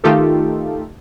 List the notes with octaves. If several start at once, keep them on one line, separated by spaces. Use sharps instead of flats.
D#3 A3 D#4 F4 G4 A4